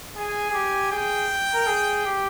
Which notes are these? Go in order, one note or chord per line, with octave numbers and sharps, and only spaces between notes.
G#4 G#5
G#4
G4
G#4 G5
A#4
G#4
G4